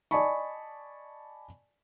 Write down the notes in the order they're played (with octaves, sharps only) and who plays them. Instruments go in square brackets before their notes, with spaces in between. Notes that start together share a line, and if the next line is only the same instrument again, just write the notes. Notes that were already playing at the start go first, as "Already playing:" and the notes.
[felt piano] D5 D#5 G#5 A5 B5 C#6